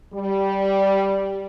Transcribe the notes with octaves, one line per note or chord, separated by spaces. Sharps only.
G3